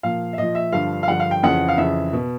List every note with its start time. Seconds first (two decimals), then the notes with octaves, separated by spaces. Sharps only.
0.03 A#2 F3 F5
0.33 E5
0.37 A#2 F3 D#5
0.55 E5
0.72 G2 D3 F3 F5
1.03 F5
1.07 G2 D3 F3 F#5
1.20 F5
1.31 G5
1.43 F2 C#3 E3 F#5
1.68 F5
1.78 F2 C#3 E3 E5
2.13 B2